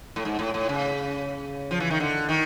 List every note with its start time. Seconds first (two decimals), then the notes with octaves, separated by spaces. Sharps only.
0.16 A2
0.25 G#2
0.39 A2
0.54 A2
0.69 C#3
1.71 F3
1.80 E3
1.90 D#3
2.00 D3
2.29 D#3